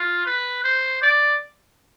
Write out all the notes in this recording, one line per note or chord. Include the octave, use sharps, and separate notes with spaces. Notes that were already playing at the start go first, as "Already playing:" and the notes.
Already playing: F4
B4
C5
D5